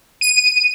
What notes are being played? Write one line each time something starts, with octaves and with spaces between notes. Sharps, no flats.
D#7